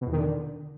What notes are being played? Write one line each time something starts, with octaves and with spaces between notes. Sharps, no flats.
B2
E2
D#3
D3